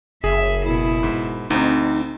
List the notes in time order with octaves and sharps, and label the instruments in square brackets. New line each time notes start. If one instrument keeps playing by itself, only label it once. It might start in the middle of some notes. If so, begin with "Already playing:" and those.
[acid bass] F#1 [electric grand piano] G#4 [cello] E5
[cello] B2 E4
[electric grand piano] G#2
[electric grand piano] D2 [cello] C4 [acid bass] D#4